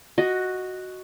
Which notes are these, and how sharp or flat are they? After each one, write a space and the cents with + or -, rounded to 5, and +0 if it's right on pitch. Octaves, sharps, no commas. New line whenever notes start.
F#4 +0 D#5 +0